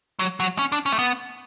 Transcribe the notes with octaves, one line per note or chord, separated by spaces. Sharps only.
F#3
F#3
C#4
D4
C#4
A3
B3